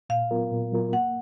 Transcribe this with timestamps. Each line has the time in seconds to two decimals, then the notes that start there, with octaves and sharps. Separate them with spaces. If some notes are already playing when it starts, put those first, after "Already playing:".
0.09 A#2 F5
0.31 F#3 B3 F4 A#4
0.51 A#2
0.72 F#3 B3 F4 A#4
0.93 A#3 F#5